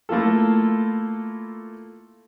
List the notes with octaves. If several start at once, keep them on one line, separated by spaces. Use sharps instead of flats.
A3 A#3 E4 F4 A4